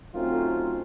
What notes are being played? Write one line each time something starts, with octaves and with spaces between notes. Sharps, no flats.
F#3 A3 C4 C#4 D#4 F4